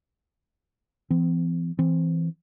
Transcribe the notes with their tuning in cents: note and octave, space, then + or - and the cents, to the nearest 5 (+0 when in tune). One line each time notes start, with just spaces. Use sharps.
E3 +35 C4 -40
E3 +0 C4 +0